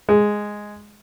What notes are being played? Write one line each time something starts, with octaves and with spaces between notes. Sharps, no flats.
G#3